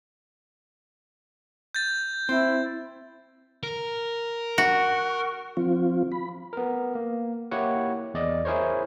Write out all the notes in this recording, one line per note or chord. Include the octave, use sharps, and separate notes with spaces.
G6 A6
C4 E4
A#4
F#4
F3 C4 F4
B5
B3 A#4
A#3
A#3 E4 G4 C#5 F#5
E2 D5 D#5
E4 G#4 A#4 C5 C#5